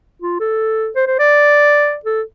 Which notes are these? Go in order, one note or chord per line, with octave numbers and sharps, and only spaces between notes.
F4
A4
C5
C5
D5
A4